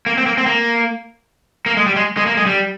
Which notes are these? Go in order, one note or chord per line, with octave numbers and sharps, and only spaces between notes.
A#3
C4
A#3
C4
A#3
A#3
G#3
G3
G#3
G#3
A#3
G#3
G3